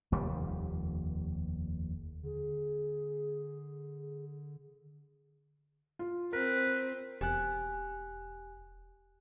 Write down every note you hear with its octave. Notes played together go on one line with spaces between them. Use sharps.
F1 D#2 G3
D3 G#4
F4
C4 A#4 B4
E1 G4 G#5 F#6